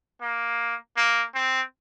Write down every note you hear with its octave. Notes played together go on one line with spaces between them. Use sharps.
A#3
A#3
C4